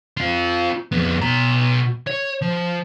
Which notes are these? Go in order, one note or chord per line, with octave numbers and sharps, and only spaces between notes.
C4 F4
F2 B3
B2 A#5
C#5
F3